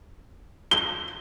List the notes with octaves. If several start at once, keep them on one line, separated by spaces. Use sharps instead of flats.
G7